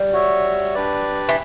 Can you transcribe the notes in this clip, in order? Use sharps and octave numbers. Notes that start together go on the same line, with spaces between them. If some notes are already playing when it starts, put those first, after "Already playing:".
Already playing: G3
F#4 C#5 E5
D4 G4 B4 D5
E3